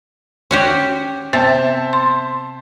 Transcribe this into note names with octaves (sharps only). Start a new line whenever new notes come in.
C#4 F#4 G4
C3 B3 C5 E5 A5
C6